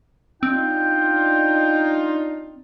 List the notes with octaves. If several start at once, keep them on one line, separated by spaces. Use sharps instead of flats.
C4 D4 D#4 F4 G5